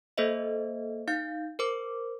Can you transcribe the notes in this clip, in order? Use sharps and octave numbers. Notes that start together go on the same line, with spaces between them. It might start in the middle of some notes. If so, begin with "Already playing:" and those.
A#3 A4 C5 D#5 E5
D#4 F5 G6
A#4 C5 D6